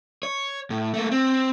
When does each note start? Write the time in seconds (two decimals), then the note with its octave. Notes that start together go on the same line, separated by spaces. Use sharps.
0.23 C#5
0.70 A2
0.94 A3 A#3
1.11 C4